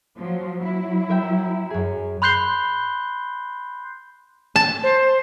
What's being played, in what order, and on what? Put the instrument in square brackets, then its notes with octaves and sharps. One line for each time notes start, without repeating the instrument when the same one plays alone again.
[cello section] F3 F#3
F#3 E4
[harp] A#4 E5 G5
F#2 G#4
[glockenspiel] B5 C6 F#6 G6 C7 G7
[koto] A5
[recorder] C5